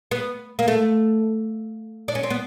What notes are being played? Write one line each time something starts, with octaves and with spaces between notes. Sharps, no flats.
B3
A#3
A3
D4
C#4
C4
B3